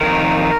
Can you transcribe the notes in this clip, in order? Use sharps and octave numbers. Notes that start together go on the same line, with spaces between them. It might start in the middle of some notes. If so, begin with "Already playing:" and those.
F2 C3 D#3 A#4